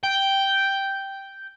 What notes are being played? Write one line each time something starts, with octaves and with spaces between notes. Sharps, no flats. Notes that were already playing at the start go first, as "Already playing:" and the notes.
G5